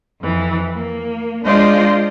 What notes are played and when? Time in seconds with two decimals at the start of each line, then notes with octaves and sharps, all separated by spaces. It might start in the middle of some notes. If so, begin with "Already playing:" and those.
0.21 F2 E3
0.75 A#3
1.45 G#3 D4 F4 C5 D5 D#5